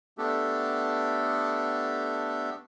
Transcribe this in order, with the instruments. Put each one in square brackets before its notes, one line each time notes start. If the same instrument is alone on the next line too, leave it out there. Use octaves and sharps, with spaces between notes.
[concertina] A3 B3 D4 G4 A4